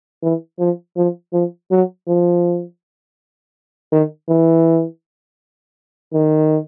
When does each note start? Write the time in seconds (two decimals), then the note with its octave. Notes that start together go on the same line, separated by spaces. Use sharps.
0.23 E3
0.59 F3
0.97 F3
1.33 F3
1.71 F#3
2.08 F3
3.92 D#3
4.29 E3
6.13 D#3